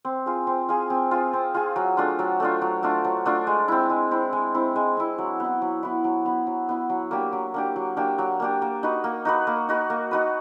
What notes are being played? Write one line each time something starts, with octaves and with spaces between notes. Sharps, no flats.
C4
F4 G#4
C4
F4 G#4
C4
F4 G#4
C4
F4 G#4
F#3
A3 D4 F4
F#3
A3 D4 F4
F#3
A3 D4 F4
F#3
A3 D4 F4
G#3
C4 E4
G#3
C4 E4
G#3
C4 E4
G#3
C4 E4
F#3
B3 E4
F#3
B3 E4
F#3
B3 E4
F#3
B3 E4
F#3
A#3 D4 G4
F#3
A#3 D4 G4
F#3
A#3 D4 G4
F#3
A#3 D4 G4
A#3
D#4 F#4 B4
A#3
D#4 F#4 B4
A#3
D#4 F#4 B4
A#3
D#4 F#4 B4